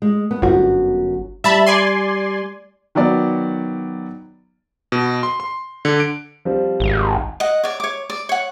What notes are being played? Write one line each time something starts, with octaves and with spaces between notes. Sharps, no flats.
G#3
B3
G1 F#2 F#4
G3 E5 A5 B5
D5 G#5 C6
D#3 F#3 B3 D5
B2
C6
C6
D3
D7
F3 G3 C4
G#1
D#5 F#5
C#5 D5
C#5 D6
D5
C#5 F#5